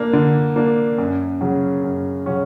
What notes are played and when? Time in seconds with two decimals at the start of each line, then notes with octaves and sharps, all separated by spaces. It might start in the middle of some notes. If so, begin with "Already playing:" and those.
Already playing: A#3 D4
0.13 D3
0.56 A#3 D4
0.98 F#2
1.41 C#3 F#3 C#4
1.84 F#2
2.26 C#3 F#3 C#4